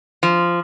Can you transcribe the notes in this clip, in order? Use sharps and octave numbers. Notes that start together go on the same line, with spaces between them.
F3